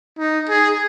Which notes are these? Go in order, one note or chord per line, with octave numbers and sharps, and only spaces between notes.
D#4
G#4